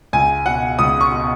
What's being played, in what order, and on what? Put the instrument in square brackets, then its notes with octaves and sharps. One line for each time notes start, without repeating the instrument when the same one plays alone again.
[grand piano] C#2 G#5
B2 F#5
C#2 D#6
C#6
B2